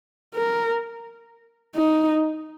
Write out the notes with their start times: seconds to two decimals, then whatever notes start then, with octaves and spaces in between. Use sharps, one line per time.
0.35 A#4
1.76 D#4